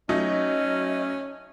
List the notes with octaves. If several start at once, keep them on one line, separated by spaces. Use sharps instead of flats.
F#3 A3 C#4 D#4 D#5